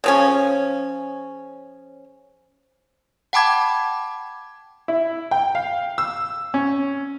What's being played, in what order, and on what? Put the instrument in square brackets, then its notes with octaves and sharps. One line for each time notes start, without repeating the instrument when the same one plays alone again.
[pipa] C#3 F3 C#4
[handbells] F#5 G5 A5 B5 D6 G#6
[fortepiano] E4
G5
F5
E6
C#4